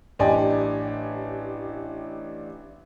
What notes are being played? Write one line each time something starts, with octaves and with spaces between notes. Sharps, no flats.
A1 D4 G4 D#5 G#5